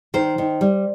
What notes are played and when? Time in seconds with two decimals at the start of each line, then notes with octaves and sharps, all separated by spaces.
0.14 D#3 C5
0.38 D#3
0.61 G3